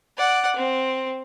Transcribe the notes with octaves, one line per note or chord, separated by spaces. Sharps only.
D5 F#5
C4